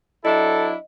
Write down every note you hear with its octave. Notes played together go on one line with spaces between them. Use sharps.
F#3 D4 E4 A4 D#5